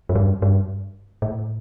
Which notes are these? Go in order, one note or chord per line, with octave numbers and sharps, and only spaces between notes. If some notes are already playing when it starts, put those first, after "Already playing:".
F#2
G2
G2
A2